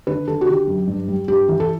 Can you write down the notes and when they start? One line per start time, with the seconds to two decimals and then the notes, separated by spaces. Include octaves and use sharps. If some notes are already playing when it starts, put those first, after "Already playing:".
0.07 D3 B4
0.27 D3 A4
0.41 F#4
0.47 D3 G4
0.68 F#2
0.87 G2
1.08 G3
1.28 G2 G4
1.48 E3
1.60 A4